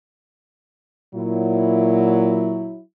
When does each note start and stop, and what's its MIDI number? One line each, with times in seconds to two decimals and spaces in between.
1.15 2.75 46
1.15 2.80 54
1.15 2.80 64